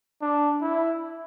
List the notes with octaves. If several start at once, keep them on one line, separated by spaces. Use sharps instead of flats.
D4
E4